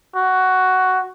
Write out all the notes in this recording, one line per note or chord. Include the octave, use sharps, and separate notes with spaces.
F#4